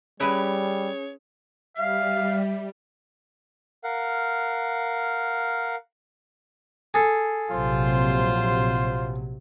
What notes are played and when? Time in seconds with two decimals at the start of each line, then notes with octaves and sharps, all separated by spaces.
0.20 G3 C#4 E4 G#4 B4 C#5
1.76 G3 E5 F5
3.84 A#4 F5 F#5
6.94 G#4 A4
7.49 A#1 C3 F#3 F4 C5